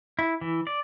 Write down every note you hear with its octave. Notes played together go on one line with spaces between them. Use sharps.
E4
E3
D5